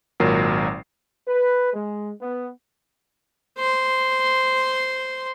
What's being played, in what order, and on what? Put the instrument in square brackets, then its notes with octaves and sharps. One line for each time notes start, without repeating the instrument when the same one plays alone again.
[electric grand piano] G#1 A#2 F#3 A#4 C7
[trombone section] B4
G#3
B3
[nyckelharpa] C5 C6